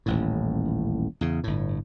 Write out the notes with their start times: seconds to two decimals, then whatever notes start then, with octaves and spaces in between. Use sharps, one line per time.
0.06 D#1 A1 A2
1.21 E2 C#3
1.44 G1 A2